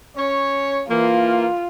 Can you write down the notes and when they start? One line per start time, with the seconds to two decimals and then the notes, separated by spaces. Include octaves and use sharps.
0.17 C#4 C#5
0.90 E3 A#3 F4